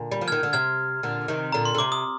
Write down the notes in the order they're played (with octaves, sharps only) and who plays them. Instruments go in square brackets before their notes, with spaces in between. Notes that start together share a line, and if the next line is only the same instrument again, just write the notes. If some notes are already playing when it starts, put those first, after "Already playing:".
Already playing: [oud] A#2 D3
G3
F3
[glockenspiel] F6 G#6
[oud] D#3
D3
[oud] C3 [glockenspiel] F6 G#6
[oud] A#2 D3
C3 D#3
[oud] A#2 D3 [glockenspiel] A#5
[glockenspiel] C6
[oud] D3
[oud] C3 [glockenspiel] D6
[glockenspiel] D#6